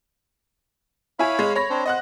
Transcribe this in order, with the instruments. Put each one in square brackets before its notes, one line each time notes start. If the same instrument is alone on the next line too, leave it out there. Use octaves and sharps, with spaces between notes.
[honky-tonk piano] E4 G#5 [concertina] C#5 F5 B5
[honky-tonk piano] G#3
C#5 B5 A#6
[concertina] C4 D4 C5
[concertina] C5 [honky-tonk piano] D#5 F#5 F#6